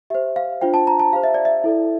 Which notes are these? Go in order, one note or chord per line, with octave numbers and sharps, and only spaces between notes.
G4 C5 E5
F5
D4 F4 C5 G5
A5
A#5
A5
G4 C5 F5
E5
D5
E5
E4 A4 D5